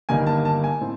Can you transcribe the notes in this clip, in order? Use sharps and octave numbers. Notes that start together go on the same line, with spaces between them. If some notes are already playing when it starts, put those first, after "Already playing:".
G1 G2 D#3 G3 A#3 G#5
A5
A5
G#5
A2 C4